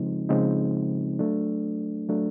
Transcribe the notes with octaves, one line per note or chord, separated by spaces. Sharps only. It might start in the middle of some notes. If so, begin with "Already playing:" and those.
Already playing: C#3 F3 G#3 C4 D#4
C#3 F3 G#3 C4 D#4
F#3 A3 D4
F#3 A3 D4